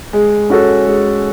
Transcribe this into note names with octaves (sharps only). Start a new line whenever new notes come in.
G#3
C#4 F#4 A4
G#3